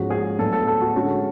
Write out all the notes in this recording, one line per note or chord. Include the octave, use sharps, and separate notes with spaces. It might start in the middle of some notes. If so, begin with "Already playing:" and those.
Already playing: G#2 F3 G#3 C#4 F#4
G#4
A2 F#3 B3 D4 A4
A4
A4
F#4
D3 G#3 C#4 F#4